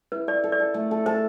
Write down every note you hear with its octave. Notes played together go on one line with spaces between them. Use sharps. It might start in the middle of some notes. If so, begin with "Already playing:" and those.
E4 B4
A4 D5
A4
D5
A4
A3
A4
A4 C5